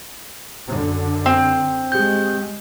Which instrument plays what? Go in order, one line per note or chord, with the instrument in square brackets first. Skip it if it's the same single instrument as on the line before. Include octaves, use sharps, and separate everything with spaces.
[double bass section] F#2 D3
[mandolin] C4 [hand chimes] C6
[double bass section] G#3 [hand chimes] G4 G6